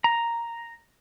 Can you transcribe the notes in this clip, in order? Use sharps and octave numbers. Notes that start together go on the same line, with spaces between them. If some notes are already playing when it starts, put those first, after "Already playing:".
A#5